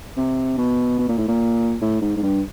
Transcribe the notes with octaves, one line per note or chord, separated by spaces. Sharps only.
C3
B2
B2
A#2
A2
A#2
A2
G#2
G#2
G2